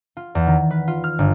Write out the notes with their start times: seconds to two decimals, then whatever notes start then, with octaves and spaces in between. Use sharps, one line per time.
0.17 F4
0.35 E2
0.47 D#3
0.71 B4
0.88 F4
1.04 F6
1.19 G1